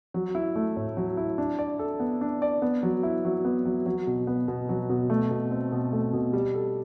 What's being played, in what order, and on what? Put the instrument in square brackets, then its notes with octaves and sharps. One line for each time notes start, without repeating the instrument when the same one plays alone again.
[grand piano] F#3
E4
A3
A2
F#3
E4
D4
D5
A4
B3
D4
D5
B3
F#3
E4
F#3
B3
F#3
F#3
B2
B3
B2
F#3
B2
A3
B2
C4
B2
A3
B2
G3
A4